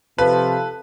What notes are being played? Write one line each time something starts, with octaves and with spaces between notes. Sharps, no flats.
C3 F3 A4 B4